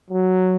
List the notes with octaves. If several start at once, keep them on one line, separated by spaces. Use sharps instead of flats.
F#3